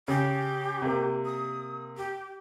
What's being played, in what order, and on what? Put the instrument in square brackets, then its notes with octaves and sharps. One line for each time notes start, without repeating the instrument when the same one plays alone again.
[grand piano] C#3 [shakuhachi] G4
[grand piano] C3 A#3
[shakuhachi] D#6
G4